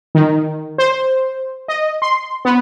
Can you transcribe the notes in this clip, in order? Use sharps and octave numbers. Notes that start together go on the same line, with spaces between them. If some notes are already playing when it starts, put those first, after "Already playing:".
D#3
C5
D#5
C6
B3